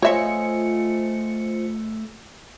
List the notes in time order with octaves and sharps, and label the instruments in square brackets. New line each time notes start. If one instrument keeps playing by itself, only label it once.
[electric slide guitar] A3 D#5 G#5 [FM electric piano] F4 C5 C#7 [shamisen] C#5 E5